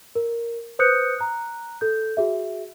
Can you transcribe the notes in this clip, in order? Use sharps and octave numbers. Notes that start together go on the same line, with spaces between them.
A#4
B4 C5 D#6 F#6 G6 C#7
A#5 F#6
A4 G6
F#4 G#4 E5